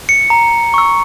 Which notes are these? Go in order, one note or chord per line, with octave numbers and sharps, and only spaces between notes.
C#7
A#5
C#6 E6